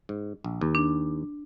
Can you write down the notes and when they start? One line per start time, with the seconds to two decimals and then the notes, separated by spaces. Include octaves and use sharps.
0.09 G#2
0.44 A#1
0.61 D#2
0.75 D4